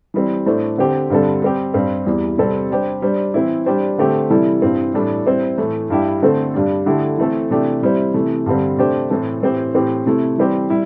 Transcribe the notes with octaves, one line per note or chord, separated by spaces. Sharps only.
E3 G3 C4
A2 A3 D4 C5
D3 C4 G4 C5
G2 D3 G3 C4 A4
G3 C4 G4
G2 G3 C4
E2 E3 G3
C3 G3 C4 A4
G3 D4 G4 C5
G3 D4 C5
E3 C4 E4
G3 D4 G4 C5
D3 A3 C4 G4 C5
C3 E3 G3 E4 A4
G2 E3 C4
A2 E3 G3 D4 A4
G3 C4 E4 C5
A2 E3 A3
G2 G3 E4 G4
D3 A3 C4 A4 C5
G2 G3 D4
D3 A3 E4 G4
E3 A3 C4 A4
C3 E3 A3 D4 G4
C3 G3 E4 C5
C3 E3 A3
G2 D3 G3 C4
C3 A3 D4 G4 C5
A2 E3 C4 A4
A2 E3 C4 G4 C5
A2 E3 C4 G4
C3 A3 E4
E3 G3 C4 G4 C5
G3 E4